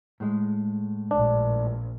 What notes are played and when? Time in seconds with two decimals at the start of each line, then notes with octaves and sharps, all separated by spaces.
0.20 A2 G#3
1.11 A#1 D4